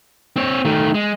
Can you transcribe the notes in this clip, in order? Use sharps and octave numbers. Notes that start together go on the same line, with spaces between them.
C4 C#5
D#3 A3
G#3